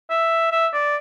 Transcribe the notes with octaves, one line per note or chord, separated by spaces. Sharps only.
E5
E5
D5